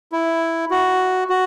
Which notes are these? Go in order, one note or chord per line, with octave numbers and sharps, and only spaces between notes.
E4
F#4
F#4